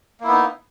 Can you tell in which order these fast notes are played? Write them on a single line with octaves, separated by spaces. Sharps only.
A#3 E4 B3 D#4